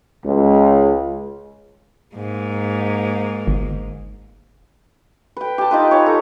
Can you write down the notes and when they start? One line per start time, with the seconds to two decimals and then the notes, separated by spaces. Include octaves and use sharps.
0.25 C#2
2.15 G#2 A#3
3.47 G1
5.37 B4 G5
5.58 G4 A5
5.71 D#4 F4 B4
5.91 C#5 G#5
6.06 A4 A#5